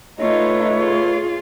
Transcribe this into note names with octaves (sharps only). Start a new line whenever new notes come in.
A3 D#4 F4 B4 C#5
F4 G#4